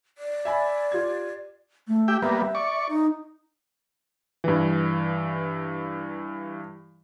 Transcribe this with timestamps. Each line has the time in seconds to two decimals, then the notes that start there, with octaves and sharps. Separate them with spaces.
0.18 D5
0.45 E5 G#5 B5
0.92 F4 G4 G#6
1.88 A3
2.08 G4 E5 G5
2.22 G3 A#3 B3 E5
2.55 D5 C#6
2.89 D#4
4.44 G2 E3